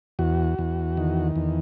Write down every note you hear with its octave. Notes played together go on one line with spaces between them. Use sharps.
E2 F#4
E2
D#3
E2